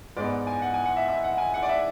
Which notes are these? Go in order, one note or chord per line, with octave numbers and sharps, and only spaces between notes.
G#2 G#3 B3 D5
G#5
F#5
G#5
F#5
E5
E5
F#5
G#5
F#5
D5
E5